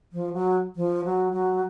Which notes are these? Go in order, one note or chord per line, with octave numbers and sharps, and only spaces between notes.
F3
F#3
F3
F#3
F#3